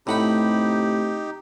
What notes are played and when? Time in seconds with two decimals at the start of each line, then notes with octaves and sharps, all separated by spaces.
0.07 A2 C3 D#4 G4 F#5 B5